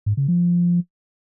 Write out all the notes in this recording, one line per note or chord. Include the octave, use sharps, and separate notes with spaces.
G#2
C#3
F3